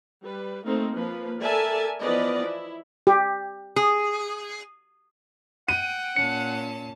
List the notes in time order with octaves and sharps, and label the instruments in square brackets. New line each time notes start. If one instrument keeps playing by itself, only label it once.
[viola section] G3 B4
A3 A#3 C4 D#4
F3 A#3 B4
A4 A#4 D5 E5 G#5 A5
E3 F3 B3 B4 D5 D#5
E4
[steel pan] G4
[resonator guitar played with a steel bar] G#4
[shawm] F#5 [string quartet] G5 [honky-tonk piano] D#7
[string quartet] A#2 C#4 A5 [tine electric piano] C#7